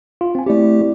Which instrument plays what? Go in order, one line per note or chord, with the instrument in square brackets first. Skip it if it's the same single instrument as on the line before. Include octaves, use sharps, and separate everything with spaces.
[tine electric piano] F4
C4 G#5
[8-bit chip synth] A3 G4 [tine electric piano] C4 E4 D5